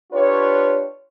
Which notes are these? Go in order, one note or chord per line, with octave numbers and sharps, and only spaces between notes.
D4 F4 G4 B4 C#5